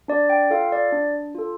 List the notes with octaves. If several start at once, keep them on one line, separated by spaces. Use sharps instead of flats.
D4 D5
G5
F4 A4 F5
D5
D4
F4 A4